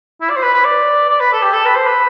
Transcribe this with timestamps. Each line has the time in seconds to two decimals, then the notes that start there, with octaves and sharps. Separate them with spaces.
0.21 E4
0.30 D5
0.36 C5
0.43 B4
0.54 B4
0.65 D5
1.10 D5
1.20 B4
1.32 A4
1.42 G4
1.53 A4
1.66 B4
1.76 C5
1.87 B4